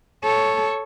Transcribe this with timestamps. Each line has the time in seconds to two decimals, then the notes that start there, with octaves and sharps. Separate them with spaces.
0.24 A4 C#5